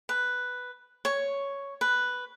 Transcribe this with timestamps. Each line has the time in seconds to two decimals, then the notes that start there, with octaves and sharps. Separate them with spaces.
0.09 B4
1.05 C#5
1.81 B4